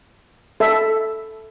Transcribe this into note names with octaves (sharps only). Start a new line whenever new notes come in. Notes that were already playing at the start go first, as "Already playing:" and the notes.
A4 E5